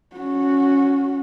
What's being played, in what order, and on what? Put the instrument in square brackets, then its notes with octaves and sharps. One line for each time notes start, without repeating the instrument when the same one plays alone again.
[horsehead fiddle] C#4 F#4